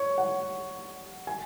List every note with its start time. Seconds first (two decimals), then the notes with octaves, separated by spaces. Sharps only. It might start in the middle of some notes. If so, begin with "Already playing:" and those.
Already playing: C#5
0.18 F#5
1.27 G#5